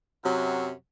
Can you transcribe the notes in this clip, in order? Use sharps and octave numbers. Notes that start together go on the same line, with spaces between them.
F#2 C3 F#3